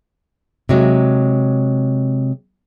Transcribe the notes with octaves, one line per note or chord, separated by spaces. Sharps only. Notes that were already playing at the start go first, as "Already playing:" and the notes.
C3 F#3 G#3